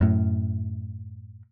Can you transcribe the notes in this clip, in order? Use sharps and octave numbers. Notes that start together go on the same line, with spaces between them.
F#2 A2